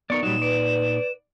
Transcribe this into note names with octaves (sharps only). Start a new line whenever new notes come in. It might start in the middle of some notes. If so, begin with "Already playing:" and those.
B3 D#4 A#4 D5 C#6
A#2 F#3 G3 D#4 E7
B4 D5